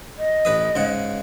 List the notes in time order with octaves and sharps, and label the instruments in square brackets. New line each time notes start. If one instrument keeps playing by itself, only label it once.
[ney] D#5
[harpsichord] A1 B4 D#6
G#2 C#3 F#5